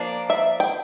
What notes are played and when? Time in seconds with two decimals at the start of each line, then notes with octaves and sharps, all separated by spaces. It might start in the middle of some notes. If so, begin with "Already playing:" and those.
Already playing: F3 A#3 D4
0.30 E5
0.60 G5